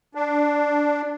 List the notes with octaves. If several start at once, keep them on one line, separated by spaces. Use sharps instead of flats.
D4